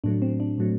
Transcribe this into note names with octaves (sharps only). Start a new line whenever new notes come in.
A2 F#3 A3 D4
C4
D4
A2 F#3 A3